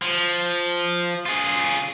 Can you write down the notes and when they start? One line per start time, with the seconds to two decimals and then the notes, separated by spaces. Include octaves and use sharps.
0.02 F3
1.26 F4 G#4